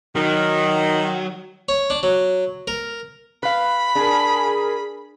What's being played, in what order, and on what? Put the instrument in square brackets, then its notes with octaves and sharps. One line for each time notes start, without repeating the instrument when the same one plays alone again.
[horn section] D#3 [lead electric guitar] F#3
[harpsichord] C#5
D4
F#3
A#4
[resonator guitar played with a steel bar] B4 F5 [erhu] B5
[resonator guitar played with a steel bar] D4 [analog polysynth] G#4 A#4